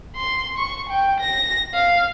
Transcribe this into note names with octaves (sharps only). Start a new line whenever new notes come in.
C6
C#6
G5
A#6
F5